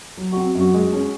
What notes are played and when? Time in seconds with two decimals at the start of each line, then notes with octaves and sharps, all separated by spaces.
0.17 F#3
0.32 C4 F#4
0.55 F#2 F#4
0.74 G#3
0.93 C#4